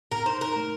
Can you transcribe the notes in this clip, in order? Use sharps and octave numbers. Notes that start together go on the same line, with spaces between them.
A2 A#4
D#4 C5
D#4 A#4
A3